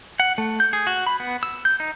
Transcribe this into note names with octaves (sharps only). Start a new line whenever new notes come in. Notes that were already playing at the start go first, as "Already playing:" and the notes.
F#5
A3
G6
G#4
F#4
B5
B3
E6
G6
D#4